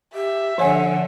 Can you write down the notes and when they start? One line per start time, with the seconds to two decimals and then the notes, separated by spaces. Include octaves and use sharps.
0.15 G4 E5
0.58 D3 F3 A4 C#5 F#5 G#5